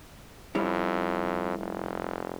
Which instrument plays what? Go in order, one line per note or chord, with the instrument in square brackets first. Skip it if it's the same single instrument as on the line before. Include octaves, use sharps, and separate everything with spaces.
[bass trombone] F2 [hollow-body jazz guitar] G3 C#4 E4
[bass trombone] F1